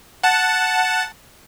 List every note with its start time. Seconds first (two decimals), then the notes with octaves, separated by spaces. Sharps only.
0.23 F#5 A5